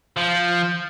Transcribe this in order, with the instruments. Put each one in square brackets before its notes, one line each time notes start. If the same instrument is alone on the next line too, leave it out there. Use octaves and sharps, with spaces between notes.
[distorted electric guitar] F3